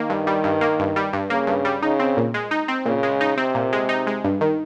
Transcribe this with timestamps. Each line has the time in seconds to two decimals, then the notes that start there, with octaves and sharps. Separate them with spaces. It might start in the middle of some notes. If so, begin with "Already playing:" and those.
Already playing: D#3 A#3
0.10 G2
0.27 G3
0.44 G2
0.61 A#3
0.79 G2
0.96 G3
1.13 G2
1.30 C#3 A#3
1.47 G2
1.65 G3
1.82 C#3 D#4
2.00 C4
2.17 A#2
2.34 G#3
2.51 D#4
2.68 C4
2.86 A#2 C#3
3.03 G#3
3.21 D#4
3.37 C3 C4
3.55 A#2
3.73 G#3
3.89 D#4
4.07 G#3
4.24 G2
4.41 D#3